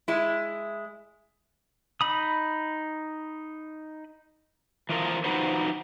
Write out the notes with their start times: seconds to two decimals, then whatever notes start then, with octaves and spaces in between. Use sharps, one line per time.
0.08 G#3 E4
2.01 D#4 B5 D#6
4.89 E3 F3 F4 A#4
5.24 F3 D#4 F#4 B4 C5